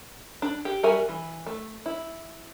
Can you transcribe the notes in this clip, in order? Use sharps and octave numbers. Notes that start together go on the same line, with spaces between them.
D4
G4
G3 F#4 A#4 E5 G#5
E3
A3
E4